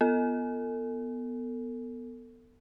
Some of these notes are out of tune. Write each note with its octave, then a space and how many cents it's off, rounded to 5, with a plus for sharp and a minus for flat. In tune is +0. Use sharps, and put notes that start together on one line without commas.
B3 +0 A4 +35